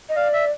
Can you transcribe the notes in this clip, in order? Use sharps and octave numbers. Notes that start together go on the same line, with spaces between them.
D#5
D5 F5
E5